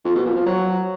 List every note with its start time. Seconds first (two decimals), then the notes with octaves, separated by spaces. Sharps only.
0.05 F2
0.15 B2
0.25 A#2
0.35 F3
0.46 F#3